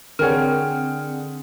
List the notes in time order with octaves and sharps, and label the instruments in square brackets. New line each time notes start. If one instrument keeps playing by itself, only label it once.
[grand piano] D3 G#4 [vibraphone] C4 [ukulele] A#4 C#5 [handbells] F#5 G5 F6